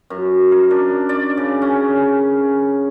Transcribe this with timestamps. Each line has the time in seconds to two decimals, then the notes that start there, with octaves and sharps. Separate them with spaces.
0.10 F#2
0.52 A#4
0.71 D4
1.09 D5
1.37 C#3
1.62 C#4